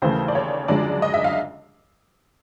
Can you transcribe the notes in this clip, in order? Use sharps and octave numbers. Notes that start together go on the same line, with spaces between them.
D#2 C#3 E3 A3 C5
D5
C#5
F#2 D3 F3 G#3 D5
D#5
E5
F5